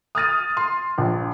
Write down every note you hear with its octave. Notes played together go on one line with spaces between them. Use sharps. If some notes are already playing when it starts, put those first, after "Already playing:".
D#6 F6 A6 D#7
C6
A#1